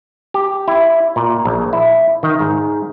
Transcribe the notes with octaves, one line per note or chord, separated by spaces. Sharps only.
G4
E4
A#2
A#1
E4
D#3
G#2